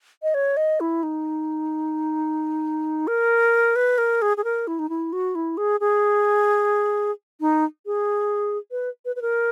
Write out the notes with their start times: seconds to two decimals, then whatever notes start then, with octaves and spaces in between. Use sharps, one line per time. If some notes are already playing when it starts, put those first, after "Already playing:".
0.23 D#5
0.34 C#5
0.57 D#5
0.80 E4
1.03 D#4
3.07 A#4
3.76 B4
3.98 A#4
4.22 G#4
4.37 G#4
4.44 A#4
4.67 E4
4.79 D#4
4.89 E4
5.13 F#4
5.35 E4
5.57 G#4
5.80 G#4
7.41 D#4
7.86 G#4
8.71 B4
9.05 B4
9.16 B4
9.22 A#4